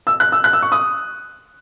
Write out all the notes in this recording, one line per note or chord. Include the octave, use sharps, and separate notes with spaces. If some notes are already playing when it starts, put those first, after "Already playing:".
E6
F#6
E6
F#6
E6
C#6
D#6